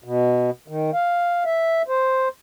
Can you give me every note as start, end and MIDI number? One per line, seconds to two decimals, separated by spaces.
0.04 0.50 47
0.68 0.91 51
0.93 1.44 77
1.45 1.82 76
1.88 2.28 72